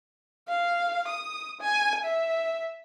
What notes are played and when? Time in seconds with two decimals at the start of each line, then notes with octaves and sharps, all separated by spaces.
0.48 F5
1.08 D#6
1.61 G#5
2.05 E5